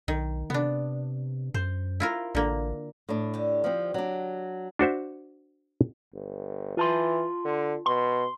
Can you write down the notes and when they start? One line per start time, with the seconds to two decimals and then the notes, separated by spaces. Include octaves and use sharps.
0.08 B1 D#3
0.50 C3 B3 D4
1.54 F#2 C5
2.00 E4 F4 A#4
2.35 A1 D3 A#3
3.09 A2 D4
3.34 D3 G4
3.64 F3 C4
3.94 F#3 D4
4.79 D4 F#4 C5 E5
6.14 G1
6.77 E3 F4 A5 C6
7.45 D3
7.86 B2 C6